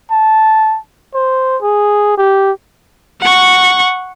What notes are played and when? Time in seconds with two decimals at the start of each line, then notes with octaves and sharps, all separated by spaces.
0.11 A5
1.14 C5
1.62 G#4
2.18 G4
3.21 F#5 C#6